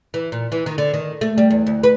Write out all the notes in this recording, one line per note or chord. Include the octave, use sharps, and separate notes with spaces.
E3
A#2
E3
D#3
D3
D#3
A3
G3
E2
D2
B4